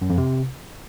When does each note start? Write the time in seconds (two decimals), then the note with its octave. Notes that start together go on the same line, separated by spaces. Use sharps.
0.01 F#2
0.10 F2
0.18 C3